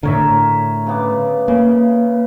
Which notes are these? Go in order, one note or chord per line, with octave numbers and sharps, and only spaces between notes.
A2 D3 A#4 C#5 E5
C#3 B3 D6
C#3 A#3